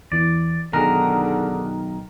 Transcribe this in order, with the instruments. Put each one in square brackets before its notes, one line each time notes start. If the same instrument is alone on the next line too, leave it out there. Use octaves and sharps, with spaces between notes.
[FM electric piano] E2 E3 [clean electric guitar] D5
[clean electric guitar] B1 D#3 [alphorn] D3 [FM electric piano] G#4 D#6 F#6 [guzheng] A#4